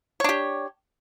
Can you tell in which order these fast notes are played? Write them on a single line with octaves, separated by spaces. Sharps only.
C#5 D4 G4